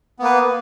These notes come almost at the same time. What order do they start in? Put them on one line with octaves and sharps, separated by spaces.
B3 A#3 B4